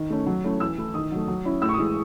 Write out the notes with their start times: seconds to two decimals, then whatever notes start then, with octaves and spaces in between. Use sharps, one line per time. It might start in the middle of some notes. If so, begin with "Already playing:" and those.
Already playing: D#3
0.10 A3 C#4
0.26 F#3
0.44 A3 C#4 E4
0.60 E3 E6
0.78 A3 E4
0.94 D#3 D#6
1.12 F#3 A3
1.28 F#3
1.45 C#4 E4
1.62 A2 E6
1.69 C#6
1.74 D#6
1.79 E3 G#3